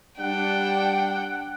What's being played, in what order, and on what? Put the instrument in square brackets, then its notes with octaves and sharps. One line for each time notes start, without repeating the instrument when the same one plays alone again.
[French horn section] G3 D4 [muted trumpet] F#5 [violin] G5